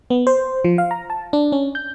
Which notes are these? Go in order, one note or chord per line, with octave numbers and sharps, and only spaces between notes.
B3
C5
F3
F5
A#5
A5
D4
C#4
G6